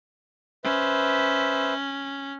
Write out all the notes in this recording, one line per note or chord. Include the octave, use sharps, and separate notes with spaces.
C#4 B4 C5 E5